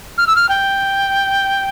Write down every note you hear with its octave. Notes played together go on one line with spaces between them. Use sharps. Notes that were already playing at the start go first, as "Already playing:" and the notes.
F6
E6
F6
G5